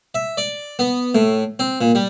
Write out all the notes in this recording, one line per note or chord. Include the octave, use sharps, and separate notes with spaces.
E5
D5
B3
A2
C4
A#2
G3